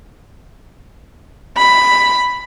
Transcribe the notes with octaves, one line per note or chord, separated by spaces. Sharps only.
B5